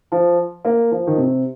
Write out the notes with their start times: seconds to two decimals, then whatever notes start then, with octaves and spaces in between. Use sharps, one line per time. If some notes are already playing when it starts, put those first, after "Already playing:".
0.12 F3
0.65 A#3
0.91 F3
1.07 D#3
1.17 C3